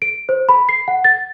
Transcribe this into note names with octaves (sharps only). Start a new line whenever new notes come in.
D7
C5
B5
C7
F#5
A6